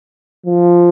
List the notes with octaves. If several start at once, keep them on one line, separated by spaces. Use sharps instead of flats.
F3